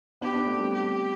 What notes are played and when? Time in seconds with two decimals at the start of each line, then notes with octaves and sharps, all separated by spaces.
0.21 B3 D4 G4
0.34 B3 D4
0.46 A3 C4
0.60 G3 B3
0.73 G4